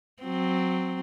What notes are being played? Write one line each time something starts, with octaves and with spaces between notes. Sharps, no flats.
F#3 C4